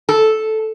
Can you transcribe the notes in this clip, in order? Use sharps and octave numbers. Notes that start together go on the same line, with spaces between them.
A4